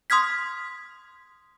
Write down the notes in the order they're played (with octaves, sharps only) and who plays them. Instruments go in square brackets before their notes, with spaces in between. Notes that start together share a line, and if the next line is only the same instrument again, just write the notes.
[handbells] C6 D#6 F6 G#6 B6